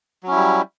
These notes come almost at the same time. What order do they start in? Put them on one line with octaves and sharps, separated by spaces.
F#3 C#4 E4 G3